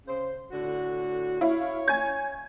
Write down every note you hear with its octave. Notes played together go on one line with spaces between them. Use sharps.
C#3 C5
A2 D3 F#4
E4 C#5 F5
G#5 G#6